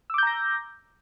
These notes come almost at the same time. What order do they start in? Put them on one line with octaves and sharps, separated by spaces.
E6 D6 G6 A#5 A#6